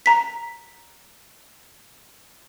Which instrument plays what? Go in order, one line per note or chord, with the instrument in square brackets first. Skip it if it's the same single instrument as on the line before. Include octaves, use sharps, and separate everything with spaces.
[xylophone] A#5 B6